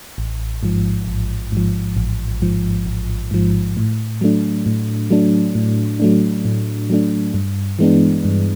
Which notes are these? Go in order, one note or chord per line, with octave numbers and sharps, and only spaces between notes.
A1
G#2 F3
A1
G#2 F3
A1
G#2 F3
A1
G#2 F3
A2
F#3 A3 D4
A2
F#3 A3 D4
A2
F#3 A3 D4
A2
F#3 A3 D4
G2
E3 G#3 B3 D4
G2